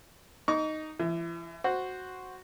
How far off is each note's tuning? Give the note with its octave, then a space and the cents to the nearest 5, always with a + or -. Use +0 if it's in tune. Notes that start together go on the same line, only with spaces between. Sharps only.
D#4 +0 C#6 +45
E3 +40 E5 -5
F#4 +0 C5 +0